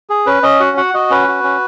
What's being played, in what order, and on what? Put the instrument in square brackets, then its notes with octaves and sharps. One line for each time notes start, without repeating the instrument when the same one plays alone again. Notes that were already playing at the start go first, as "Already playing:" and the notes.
[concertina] G#4
C#4 B4
C#4 D#5
F#4 F#5
F#4 F#5
F#4 D#5
C#4 B4
F#4
C#4